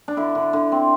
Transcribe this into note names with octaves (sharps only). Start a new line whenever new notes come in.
D4
D3 E4
D3
D3
C4